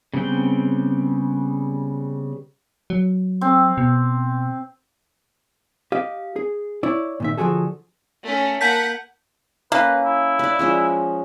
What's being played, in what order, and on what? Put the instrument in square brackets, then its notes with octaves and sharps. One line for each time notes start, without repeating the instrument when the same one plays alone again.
[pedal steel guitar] C#3 G3 B3 C4 G5
[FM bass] F#3
[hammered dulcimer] C4
[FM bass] B2
[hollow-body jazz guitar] G4 D#5 F5
G#4
E4 C#5 D5
A#2 D#3 E5
D3 F3 F#4 G#4 A4
[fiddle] A3 C#4
[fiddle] A#3 F#5 [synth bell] A5 G6 B6
[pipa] A#3 [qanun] C#4 [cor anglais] B4
[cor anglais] E4
[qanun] B4 D5
F3 G#3 C#4